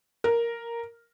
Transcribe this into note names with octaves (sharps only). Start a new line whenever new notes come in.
A#4